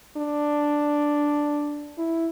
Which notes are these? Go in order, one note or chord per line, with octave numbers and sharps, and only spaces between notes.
D4
E4